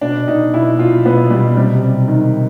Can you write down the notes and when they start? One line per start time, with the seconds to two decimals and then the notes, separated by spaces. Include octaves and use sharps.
0.01 B2 D4
0.27 B2 D#4
0.54 B2 E4
0.79 B2 F4
1.05 B2 B3
1.30 B2 G3
1.57 C3 G3
1.83 C3
2.08 D#3